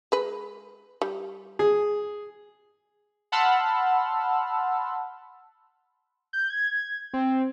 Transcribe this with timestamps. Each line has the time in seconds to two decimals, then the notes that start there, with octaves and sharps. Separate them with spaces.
0.12 G#3 B4
1.02 G3
1.59 G#4
3.32 F#5 A5 B5 C6 E6 F6
6.33 G6
6.50 G#6
7.13 C4